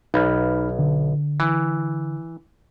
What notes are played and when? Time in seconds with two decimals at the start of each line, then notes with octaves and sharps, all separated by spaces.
0.14 B1 D#4 B5 F6
0.79 D3
1.40 E3